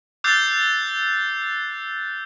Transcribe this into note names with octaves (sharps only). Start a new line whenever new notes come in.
D6 E6 F#6 G6 A6 C7